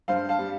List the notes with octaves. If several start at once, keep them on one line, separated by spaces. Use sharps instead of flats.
G2 C5 F5
F5 A5
G3